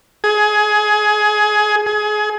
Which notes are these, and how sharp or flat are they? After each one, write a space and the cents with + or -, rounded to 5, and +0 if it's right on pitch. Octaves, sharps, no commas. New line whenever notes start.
G#4 +20
G#4 +25